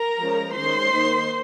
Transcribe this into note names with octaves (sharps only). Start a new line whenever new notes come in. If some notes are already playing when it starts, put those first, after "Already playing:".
Already playing: A#4 A#5
F3 G#3 C#4
D#3 G#3 C#4 C5 C6
D#3 A#3 D#4